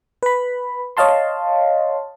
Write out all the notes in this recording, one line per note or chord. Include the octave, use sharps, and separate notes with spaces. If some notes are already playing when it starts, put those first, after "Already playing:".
B4 B5
C#5 D#5 F5 A5 C6